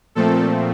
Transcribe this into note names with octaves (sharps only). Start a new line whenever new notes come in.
A#2 F3 A3 C4 A4